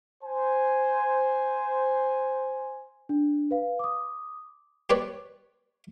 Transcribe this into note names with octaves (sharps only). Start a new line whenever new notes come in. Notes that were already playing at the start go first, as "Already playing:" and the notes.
C5 G#5
D4
B4 F5
D6 D#6
G4 B4 C#5 D5